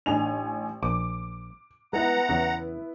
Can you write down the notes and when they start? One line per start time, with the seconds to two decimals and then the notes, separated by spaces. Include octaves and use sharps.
0.06 A1 D4 D#4 G#4 G#5 F7
0.83 A#1 D6
1.93 G#3 B3 E4 B4 F#5 A#5
2.29 E2 C#3